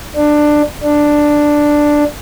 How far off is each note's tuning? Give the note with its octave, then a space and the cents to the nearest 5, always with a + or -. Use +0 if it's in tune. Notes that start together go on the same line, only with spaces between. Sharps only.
D4 +15
D4 +5